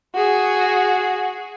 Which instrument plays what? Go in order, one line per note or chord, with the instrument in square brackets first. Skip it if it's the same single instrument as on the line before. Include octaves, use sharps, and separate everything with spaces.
[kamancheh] F#4 G#4